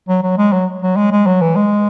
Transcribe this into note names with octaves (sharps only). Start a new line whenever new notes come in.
F#3
F#3
G#3
F#3
F#3
G#3
G#3
F#3
E3
G#3